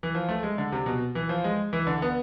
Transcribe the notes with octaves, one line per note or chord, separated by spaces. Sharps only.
E3
F3
A3
G#3
D3
C3
B2
E3
F3
G#3
E3
D3
B3